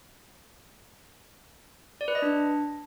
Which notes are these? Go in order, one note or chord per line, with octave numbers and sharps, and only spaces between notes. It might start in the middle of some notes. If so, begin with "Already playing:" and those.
D5
B4
D#5
D4